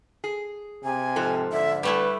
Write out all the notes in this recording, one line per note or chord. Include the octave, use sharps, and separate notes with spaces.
G#4
C3 G#5
G#2 F3 A4
D3 E5
G3 A3 E4 B4